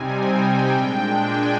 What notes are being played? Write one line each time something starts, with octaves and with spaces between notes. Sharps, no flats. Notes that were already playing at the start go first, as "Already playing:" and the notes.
Already playing: C3 G3 C4 D#4 G#5
G5
A#2 G#3 D4 G5
G#5